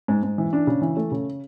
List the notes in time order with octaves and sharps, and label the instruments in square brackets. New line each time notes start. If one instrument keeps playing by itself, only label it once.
[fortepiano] G#2
G#2
E3
D4
C#3
E3
A3
C#3